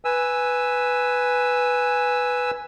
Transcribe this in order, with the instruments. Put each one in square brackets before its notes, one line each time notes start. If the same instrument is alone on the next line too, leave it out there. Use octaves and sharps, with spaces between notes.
[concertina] B4 G#5 E6